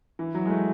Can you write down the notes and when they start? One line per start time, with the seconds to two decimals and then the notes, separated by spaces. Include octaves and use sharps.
0.19 E3
0.35 F#3
0.46 G#3
0.50 A3